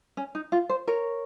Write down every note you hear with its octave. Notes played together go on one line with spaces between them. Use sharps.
C#4
D#4
F4
C5
A#4 C#5